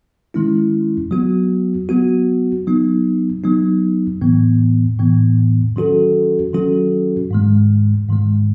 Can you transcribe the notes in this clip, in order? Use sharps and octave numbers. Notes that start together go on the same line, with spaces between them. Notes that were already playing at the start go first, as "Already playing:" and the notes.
D#3 G#3 C#4 E4
F#3 B3 F#4
F#3 B3 F#4
F#3 B3 D#4
F#3 B3 D#4
A2 E3 B3
A2 E3 B3
D#3 F#3 C#4 F#4 A4
D#3 F#3 C#4 F#4 A4
G#2 D#3 G#3
G#2 D#3 G#3